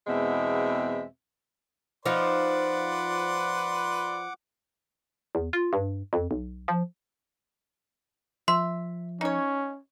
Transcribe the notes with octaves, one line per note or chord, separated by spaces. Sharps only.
E2 B2 G#3 C4 E5
F3 D#4 B4 D5 F#5 C6 D6
E2
F4
G2
F2
B1
F3
F3 E5 C6
C#4 D#4 C#5